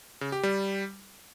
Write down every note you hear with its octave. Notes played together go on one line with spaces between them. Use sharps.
C#3
G4
G3